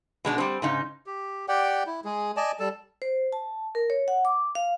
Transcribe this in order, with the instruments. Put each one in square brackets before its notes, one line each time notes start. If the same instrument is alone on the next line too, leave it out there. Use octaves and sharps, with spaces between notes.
[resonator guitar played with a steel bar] B2 G#3 D4
G3 C4
G#2 C#3 D#4
[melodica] G4
G4 D5 F#5 G5
E4
G#3 G#4
D5 D#5 G#5 A5
G3 A4 A5
[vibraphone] C5
A5
A#4
C#5
F#5
D6
F5